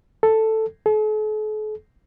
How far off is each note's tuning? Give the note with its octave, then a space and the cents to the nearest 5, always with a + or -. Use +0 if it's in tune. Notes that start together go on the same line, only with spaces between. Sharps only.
A4 +5
A4 -45